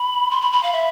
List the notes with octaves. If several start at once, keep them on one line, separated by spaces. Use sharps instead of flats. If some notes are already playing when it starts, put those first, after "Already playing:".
Already playing: B5
C6
B5
B5
F5
E5